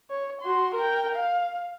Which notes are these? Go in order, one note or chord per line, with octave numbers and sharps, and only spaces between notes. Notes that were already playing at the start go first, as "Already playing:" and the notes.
C#5
F#4 C6
A#4 G5
F5